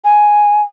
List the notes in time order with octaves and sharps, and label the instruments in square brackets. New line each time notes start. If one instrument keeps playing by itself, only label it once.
[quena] G#5